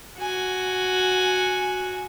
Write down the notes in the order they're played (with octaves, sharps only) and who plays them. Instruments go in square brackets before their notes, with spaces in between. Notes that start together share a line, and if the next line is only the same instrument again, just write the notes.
[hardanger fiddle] F#4 G#5